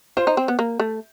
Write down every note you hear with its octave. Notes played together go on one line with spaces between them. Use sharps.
F4 C5
D#4
C4
B3
A#3
A3